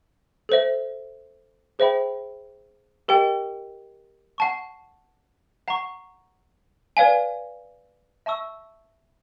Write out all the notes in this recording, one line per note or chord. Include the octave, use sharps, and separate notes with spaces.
A4 C5 E5
G#4 C5 E5 G5 B5
G4 A#4 D#5 G5
F#5 A5 C#6
F#5 A#5 C#6
B4 D5 F5 G#5
E5 A5 C#6 E6